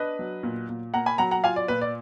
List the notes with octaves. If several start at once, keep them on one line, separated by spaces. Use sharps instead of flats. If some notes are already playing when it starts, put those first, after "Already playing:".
Already playing: D4 B4 D#5
F#3
A#2
A#2
A#3 F#5 A#5
G#5 B5
F#3 F#5 A#5
F#5 A#5
F4 F5 G#5
D5
A#2 B4
D5